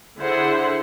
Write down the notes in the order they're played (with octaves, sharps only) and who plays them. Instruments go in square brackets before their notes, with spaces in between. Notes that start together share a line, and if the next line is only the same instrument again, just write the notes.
[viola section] D3 E4 G#4 C5 F#5